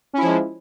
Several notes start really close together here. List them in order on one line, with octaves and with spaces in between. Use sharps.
C#4 E4 F3 G#3